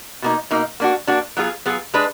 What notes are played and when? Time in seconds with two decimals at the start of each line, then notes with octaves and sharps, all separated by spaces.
0.22 B2 A#3 D#4
0.51 B2 A#3 D#4
0.80 A#3 D4 F#4
1.07 A#3 D4 F#4
1.37 F#3 B3 F4 G#4
1.65 F#3 B3 F4 G#4
1.94 G#3 D4 G#4 B4